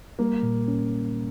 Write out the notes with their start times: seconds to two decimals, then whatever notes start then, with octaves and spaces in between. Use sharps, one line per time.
0.19 G3 A#3
0.43 A#2
0.68 C#4